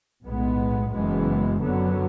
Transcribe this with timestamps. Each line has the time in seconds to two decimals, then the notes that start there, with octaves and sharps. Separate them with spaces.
0.25 B1 A2 G#3 B3
0.93 F#1 F#2 E3 G#3 B3
1.62 F#2 D3 F#3 B3